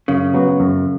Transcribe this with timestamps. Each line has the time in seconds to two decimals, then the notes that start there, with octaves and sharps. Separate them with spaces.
0.08 F#2 C#3
0.34 F#3 B3 F#4
0.60 F#2